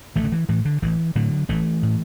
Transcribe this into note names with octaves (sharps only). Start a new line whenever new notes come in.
A1 E3 A3
D3
E3
A2 E3
D3
A1 E3
A2 D3 F#3
A1 E3 A3
A2